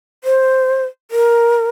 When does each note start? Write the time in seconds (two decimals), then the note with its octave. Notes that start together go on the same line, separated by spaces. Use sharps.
0.24 C5
1.11 A#4